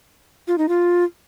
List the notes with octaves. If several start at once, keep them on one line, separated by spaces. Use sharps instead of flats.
F4
D#4
F4